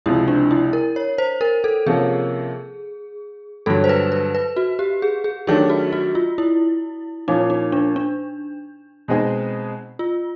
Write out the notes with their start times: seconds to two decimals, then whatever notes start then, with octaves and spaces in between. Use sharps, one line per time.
0.06 C#2 C3 F3 E4
0.28 D4
0.51 E4
0.73 A#4
0.96 C#5
1.18 C5
1.41 A#4
1.64 A4
1.86 C3 F3 A#3 C#4 G#4
3.66 G2 D3 F#3 A4
3.84 C5
3.89 B4
4.12 B4
4.35 B4
4.57 F#4
4.79 G4
5.02 G#4
5.24 G#4
5.47 D#3 F#3 A3 D4 G4 G#4
5.70 F#4
5.93 F#4
6.15 F4
6.38 E4
7.28 A#2 F3 A#3 C#4 D#4
7.50 D#4
7.72 D4
7.96 D4
9.08 B2 G#3 C4 D#4 G#4
9.99 F4